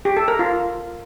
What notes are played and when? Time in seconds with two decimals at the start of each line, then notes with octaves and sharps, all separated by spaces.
0.05 G4
0.17 A4
0.28 A#4
0.39 F4